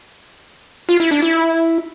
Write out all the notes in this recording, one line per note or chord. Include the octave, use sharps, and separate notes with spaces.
F4
E4
D4
E4